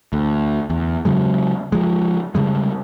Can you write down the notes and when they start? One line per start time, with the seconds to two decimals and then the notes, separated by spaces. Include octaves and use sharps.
0.13 D2
0.70 E2
1.05 C#3 F#3 G#3
1.72 F3 G#3
2.35 C#3 G3 G#3